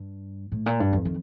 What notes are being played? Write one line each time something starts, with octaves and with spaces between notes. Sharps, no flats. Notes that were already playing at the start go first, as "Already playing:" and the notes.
Already playing: G2
A2
A#2
G2
F2
D#3